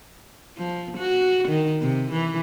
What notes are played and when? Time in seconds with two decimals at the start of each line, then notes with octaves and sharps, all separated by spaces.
0.57 F3
0.97 F#4
1.48 D#3
1.82 C3
2.12 E3